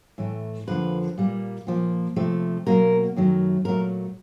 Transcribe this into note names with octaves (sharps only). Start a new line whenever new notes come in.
A2 E3 A3
F2 D3 F3 A#3 B4
A#2 G3 A#3
A#2 F3 A#3
C3 F3 A3
B2 F#3 A#3 A#4
F#2 D#3 F#3 A3
A#2 F#3 A3 A#4